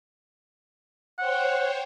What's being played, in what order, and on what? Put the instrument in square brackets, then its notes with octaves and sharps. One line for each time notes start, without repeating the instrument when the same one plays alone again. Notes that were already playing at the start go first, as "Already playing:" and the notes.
[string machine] C5 C#5 G5 [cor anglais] F#5